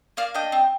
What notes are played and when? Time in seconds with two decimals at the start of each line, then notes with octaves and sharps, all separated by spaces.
0.17 A#3 D5 F5
0.34 D4 D#5 G5
0.52 C4